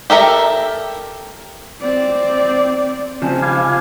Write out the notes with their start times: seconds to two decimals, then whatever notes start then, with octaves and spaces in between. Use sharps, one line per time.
0.10 G4 A4 A#4 E5
1.81 C4 D5
3.22 C#3 F3 C4 G#5 A5 F6
3.42 F5 G#5 B5 D6 F#6